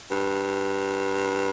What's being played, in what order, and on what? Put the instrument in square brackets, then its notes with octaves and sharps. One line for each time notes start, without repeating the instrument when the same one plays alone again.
[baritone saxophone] G2